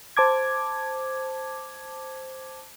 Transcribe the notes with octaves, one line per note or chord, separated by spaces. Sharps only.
C5 A5 D6 G#6